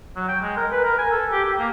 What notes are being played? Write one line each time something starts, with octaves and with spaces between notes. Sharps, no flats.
F#3
G5
G#3
A#4
B4
A#4
G#5
A4
G4
G4
A#3